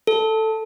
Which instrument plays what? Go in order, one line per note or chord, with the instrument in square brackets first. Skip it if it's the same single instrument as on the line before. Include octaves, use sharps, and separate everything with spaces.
[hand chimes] A4